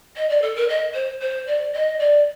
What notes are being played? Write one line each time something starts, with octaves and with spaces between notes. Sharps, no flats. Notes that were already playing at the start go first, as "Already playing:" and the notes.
D#5
D5
A4
A#4
D#5
C5
C5
D5
D#5
D5